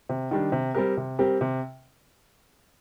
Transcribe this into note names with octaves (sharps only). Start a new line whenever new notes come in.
C3
D#3 G3 D4
C3
G3 C4 G4 A#4
C3
G3 C4 G4 A#4
C3